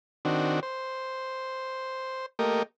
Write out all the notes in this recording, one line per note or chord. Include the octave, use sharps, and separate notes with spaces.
D#3 C4 D4 F#4
C5
A3 A#3 G4 A#4 D#5